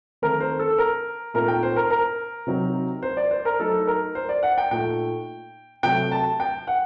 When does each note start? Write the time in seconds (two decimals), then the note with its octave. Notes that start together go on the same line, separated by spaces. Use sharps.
0.22 D#3 A3 C4 A#4
0.40 C5
0.59 A4
0.78 A#4
1.34 A#2 A3 C4 D#4 A#4
1.48 G5
1.63 C5
1.76 A#4
1.90 A#4
2.47 C3 F#3 C4 D#4
3.03 C5
3.17 D5
3.31 C5
3.45 A#4
3.60 F#3 A3 D#4 A4
3.87 A#4
4.15 C5
4.29 D5
4.43 F#5
4.58 G5
4.71 A#2 A3 D#4 G5
5.83 C3 F#3 A3 G5
6.12 A5
6.40 G5
6.67 F#5